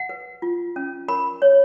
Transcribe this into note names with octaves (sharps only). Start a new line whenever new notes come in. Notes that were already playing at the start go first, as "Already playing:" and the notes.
Already playing: F#5
B4
F4
C#4
A#4 B5
C#5